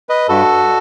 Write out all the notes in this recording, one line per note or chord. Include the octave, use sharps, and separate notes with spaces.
B4 D#5
G2 F#4 A4